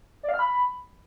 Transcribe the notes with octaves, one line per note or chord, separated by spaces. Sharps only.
D5
F5
F6
B5